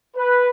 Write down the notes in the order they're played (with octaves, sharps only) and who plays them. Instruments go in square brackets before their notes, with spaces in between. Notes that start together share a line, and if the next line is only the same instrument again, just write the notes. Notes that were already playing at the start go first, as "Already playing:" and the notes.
[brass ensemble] B4